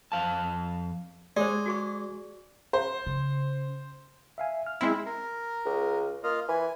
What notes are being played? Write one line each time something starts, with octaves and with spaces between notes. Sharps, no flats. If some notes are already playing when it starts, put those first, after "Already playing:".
F2 F5 A5
G#3 G4 C5 D5
F#4 G#4 C#6
C5
C#3
E5 F5 G#5
F6
G#3 C4 E4
A#4
C#2
A#3 F4 D#5 F5
E3 G#5